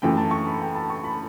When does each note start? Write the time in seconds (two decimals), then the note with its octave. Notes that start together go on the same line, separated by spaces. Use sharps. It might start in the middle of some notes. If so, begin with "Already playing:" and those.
0.02 F#2 E3 A3 G5
0.17 A5
0.31 C#6
0.47 B5
0.61 G5
0.75 A5
0.90 C#6
1.04 B5